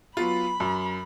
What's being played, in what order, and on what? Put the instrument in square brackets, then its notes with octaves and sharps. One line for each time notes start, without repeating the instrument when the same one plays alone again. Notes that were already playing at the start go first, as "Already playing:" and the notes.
[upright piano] F#3 B3 F4 [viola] B5
[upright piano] F#2